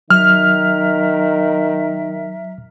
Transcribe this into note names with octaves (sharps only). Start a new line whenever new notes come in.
D#3 F#3 A#4 E5 F6